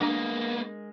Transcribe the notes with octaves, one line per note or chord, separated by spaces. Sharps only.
G#3 A#3 B3 D4 A#4 D#5 A#5